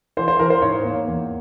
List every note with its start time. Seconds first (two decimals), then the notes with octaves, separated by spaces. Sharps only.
0.17 E3 C5
0.28 C5
0.39 E3 A#4
0.50 C5
0.62 G#2 C#5
0.85 A#3
1.07 E2